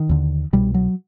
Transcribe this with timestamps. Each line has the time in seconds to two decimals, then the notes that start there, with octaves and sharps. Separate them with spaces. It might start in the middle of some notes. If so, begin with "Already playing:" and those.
Already playing: D#3
0.09 D#2 D3
0.53 C2 B2 G3
0.74 F#3